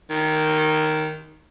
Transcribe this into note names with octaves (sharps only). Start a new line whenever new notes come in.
D#3